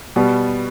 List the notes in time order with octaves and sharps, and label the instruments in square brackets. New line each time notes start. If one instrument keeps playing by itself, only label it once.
[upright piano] B2 G3 B3